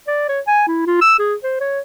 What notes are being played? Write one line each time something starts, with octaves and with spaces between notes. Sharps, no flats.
D5
C#5
G#5
E4
F4
E6
G#4
C5
C#5